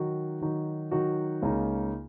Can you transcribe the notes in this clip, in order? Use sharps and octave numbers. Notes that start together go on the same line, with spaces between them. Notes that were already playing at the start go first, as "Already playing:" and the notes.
Already playing: D#3 F#3 D#4 F#4
D#3 F#3 D#4 F#4
D#3 F#3 D#4 F#4
C#2 C#3 A#3 D#4